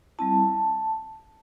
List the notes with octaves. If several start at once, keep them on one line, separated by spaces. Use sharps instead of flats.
G3 C4 E4 A5